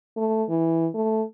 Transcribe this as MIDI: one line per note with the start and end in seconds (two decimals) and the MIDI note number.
0.16 0.44 57
0.49 0.87 52
0.94 1.22 57